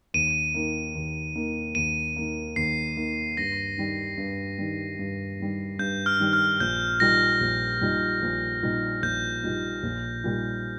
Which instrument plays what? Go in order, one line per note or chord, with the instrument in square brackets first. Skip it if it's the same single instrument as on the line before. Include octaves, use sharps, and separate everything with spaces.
[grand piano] D#2 [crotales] D#7
[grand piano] D#3 A#3
D#2
D#3 A#3
[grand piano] D#2 [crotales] D#7
[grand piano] D#3 A#3
[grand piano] D#2 [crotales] C7
[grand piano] D#3 A#3
[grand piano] G2 [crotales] A#6
[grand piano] D#3 G3
G2
D#3 G3
G2
D#3 G3
[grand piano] G2 [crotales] G6
[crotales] F6
[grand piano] D#3 G3
[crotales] F6
[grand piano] A#1 [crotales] G6
[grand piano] A#2 G3 D#4 [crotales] A#6
[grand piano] A#1
A#2 G3 D#4
A#1
A#2 G3 D#4
[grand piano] A#1 [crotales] G6
[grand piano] A#2 G3 D#4
A#1
A#2 G3 D#4 G4